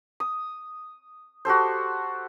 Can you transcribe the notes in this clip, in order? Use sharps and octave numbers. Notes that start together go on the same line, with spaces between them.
D#6
F#4 G4 A4 C5